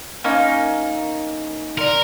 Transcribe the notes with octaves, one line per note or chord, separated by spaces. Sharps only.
A#3 C#4 D#4
A#4 D5 C6